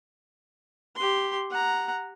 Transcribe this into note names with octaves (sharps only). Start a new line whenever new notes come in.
G4 C6
F#5 A#5